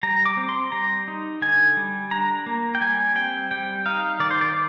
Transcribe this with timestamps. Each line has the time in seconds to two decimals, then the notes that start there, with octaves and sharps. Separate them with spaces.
0.03 G3 A#5
0.26 D6
0.37 C4
0.49 C6
0.72 G3 A#5
1.08 D#4
1.42 D3 G#5
1.77 G3
2.11 D4 A#5
2.46 A#3
2.75 G5
2.81 G3 G#5
3.15 C4 G5
3.51 G3 G5
3.86 D#4 F5
4.20 D#3 D5
4.31 C5
4.41 D5